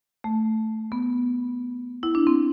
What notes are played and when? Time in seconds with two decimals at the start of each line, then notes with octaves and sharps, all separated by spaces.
0.24 A3
0.92 B3
2.03 E4
2.15 D4
2.27 C4